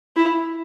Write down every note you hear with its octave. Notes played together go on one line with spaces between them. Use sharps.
E4